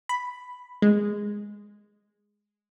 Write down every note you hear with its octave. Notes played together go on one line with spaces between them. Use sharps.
B5
G#3